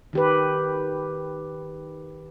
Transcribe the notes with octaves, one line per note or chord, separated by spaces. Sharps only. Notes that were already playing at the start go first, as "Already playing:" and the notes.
D#3 G4 B4